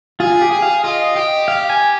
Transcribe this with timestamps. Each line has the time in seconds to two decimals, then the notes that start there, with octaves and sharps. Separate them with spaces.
0.20 F4 G#4
0.41 G4
0.52 G#4
0.62 F5
0.84 F4 D#5
1.16 G4
1.48 F5
1.70 G#5